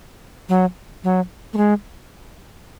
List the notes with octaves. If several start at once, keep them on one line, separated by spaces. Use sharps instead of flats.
F#3
F#3
A3
G#3